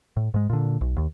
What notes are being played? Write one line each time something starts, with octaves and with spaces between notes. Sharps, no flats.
A2
G#2 G#3
A#2 D3
B1
D#2